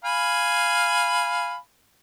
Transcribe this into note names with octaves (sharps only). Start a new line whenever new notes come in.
F5 G#5 B5